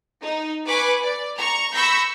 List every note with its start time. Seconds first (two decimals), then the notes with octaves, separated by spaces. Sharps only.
0.23 D#4
0.67 B4 G#5 C#6 D6 F#6 B6
1.04 D5
1.38 A#5 C#6
1.73 B5 C#6 E6 G6 A#6 B6